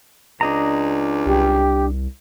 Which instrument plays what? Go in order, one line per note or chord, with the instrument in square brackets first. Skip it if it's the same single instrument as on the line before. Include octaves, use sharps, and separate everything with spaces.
[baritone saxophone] C#2 [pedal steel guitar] D4 D#5 A#5
[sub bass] C2 [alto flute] G4